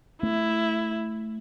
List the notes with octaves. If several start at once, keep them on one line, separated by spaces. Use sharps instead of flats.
A3 E4